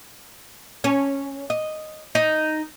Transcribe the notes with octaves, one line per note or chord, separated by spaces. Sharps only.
C#4
D#5
D#4